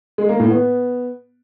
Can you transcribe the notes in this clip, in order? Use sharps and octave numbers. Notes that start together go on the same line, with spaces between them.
G#3
A#3
A2
B3